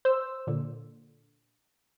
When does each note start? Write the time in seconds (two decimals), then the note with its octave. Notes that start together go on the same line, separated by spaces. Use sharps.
0.05 C5 E6
0.47 A#2 D3